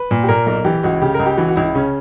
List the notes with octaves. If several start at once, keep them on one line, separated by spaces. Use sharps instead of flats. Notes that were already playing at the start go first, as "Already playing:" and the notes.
Already playing: B4
A#2
G4
A#2 A#4
B1 A#4
E3 G4
C#2 F#4
C#3 G4
C#2 A#4
G4
E3 F#4
F#4
C#2 E4
C#3 C#4